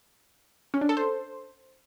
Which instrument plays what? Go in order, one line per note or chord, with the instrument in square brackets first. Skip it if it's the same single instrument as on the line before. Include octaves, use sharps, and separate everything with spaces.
[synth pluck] C#4
D4
A4
C5